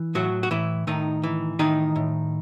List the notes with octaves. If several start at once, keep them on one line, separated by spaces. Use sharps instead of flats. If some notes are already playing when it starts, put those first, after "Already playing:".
Already playing: E3
A2 F#3 F#4
F#4
A2 E3 E4
A2 D#3 D#4
E3
A2 D#3 D#4
A2